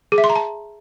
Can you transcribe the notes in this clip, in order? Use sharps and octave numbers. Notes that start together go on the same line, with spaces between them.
G#4
E5
C6
A#5
A5